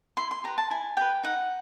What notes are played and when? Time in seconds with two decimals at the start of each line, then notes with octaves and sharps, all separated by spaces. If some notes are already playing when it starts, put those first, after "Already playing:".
0.17 E4 C6
0.31 C6
0.44 G4 B4 A#5
0.58 A5
0.70 E4 G#5
0.97 G4 B4 G5
1.23 D#4 F#5